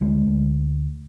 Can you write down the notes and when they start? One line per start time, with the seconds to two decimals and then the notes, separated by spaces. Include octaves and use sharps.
0.01 D2 G#3
0.26 D2